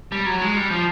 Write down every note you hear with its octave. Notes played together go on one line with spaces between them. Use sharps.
G3
F#3
G#3
G3
F3